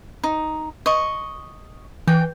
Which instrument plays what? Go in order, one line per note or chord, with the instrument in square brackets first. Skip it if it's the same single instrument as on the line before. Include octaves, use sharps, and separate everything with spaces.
[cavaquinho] D#4
D#5 C#6
[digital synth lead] E3 [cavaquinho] G5